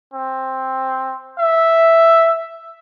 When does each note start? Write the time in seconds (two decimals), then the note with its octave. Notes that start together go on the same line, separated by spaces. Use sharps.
0.14 C4
1.39 E5